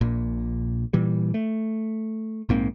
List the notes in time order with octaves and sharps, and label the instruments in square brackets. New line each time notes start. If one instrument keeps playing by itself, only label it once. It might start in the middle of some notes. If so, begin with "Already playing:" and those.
[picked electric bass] A#1 A#2
A#2 E3 G3
A3
A#1 G#2 A#3 C4